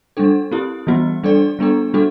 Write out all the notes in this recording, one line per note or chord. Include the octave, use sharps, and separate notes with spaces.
G3 D4 A4
C4 E4 G4
E3 G3 B3 F#4
G3 D4 A4 D5
G3 B3 D4 A4
G3 D4 F#4 A4